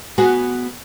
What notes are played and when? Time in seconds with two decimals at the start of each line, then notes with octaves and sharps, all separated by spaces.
0.18 B3 F#4 G#4